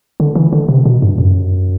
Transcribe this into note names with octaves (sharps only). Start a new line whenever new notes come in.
D3
E3
D3
C3
B2
G2
F#2